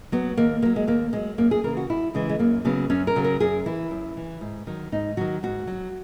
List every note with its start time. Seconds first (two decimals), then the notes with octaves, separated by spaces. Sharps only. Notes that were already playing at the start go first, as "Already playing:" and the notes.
0.12 F#3 B3
0.37 D#2 A#3
0.62 D#3 F#3 A#3
0.76 G#3
0.87 D#2 A#3
1.13 D#3 F#3 G#3
1.38 F#2 A#3
1.51 G#4
1.63 C#3 E3 A#4
1.77 F#4
1.89 F#2 E4
2.14 C#3 E3 G#3
2.29 G#3
2.39 F#2 A#3
2.65 C#3 F#3 B3
2.90 F#2 C#4
3.07 A#4
3.16 C#3 F#3
3.24 A#4
3.40 F#2 G#4
3.66 E3 E4
3.91 F#2
4.17 E3
4.41 G#2
4.67 D#3 F#3
4.92 G#2 D#4
5.17 D#3 F#3 F#4
5.43 G#2 F#4
5.67 F#3